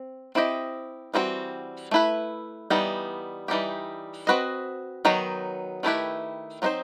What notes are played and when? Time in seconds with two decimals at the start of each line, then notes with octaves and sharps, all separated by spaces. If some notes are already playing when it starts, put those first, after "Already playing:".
Already playing: C4
0.35 C4 E4 G4 D#5
1.14 E3 G3 C4 D#4 F#4
1.91 A3 E4 B4
2.70 E3 G3 B3 D#4
3.48 E3 G3 D#4 G4
4.27 C4 F#4 B4 D#5
5.05 D#3 F#3 B3 D#4
5.83 D#3 A3 E4 G4 B4
6.62 F#3 C4 D#4 F#4 C5